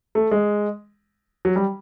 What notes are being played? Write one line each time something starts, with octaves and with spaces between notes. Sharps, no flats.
A3
G#3
F#3
G3